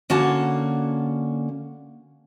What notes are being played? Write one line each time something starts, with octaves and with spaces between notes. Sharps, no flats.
D3 A#3 C#4 F#4 A5